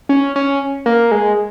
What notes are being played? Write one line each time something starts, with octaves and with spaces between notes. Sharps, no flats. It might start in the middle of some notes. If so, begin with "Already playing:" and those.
C#4
C#4
A#3
G#3